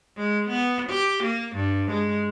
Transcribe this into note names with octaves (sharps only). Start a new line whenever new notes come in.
G#3
B3
G4
A#3
G2
G#3